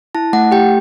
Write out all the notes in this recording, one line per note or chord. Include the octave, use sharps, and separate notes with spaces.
E4 A5
A3 F#5
G4 G5